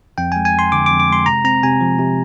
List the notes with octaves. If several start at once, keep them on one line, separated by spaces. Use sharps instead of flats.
F2 G5
G#3 G#5
G#5
F2 C6
D3 D6
F2 D6
D6
G#3 C6
C3 A#5
C4 A#5
C3 G#5
F3
C3